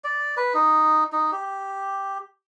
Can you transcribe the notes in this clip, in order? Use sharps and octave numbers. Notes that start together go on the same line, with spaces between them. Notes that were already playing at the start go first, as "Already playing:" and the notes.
D5
B4
D#4
D#4
G4